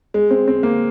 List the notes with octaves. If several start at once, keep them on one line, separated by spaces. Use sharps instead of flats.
G#3
C4
C4
A#3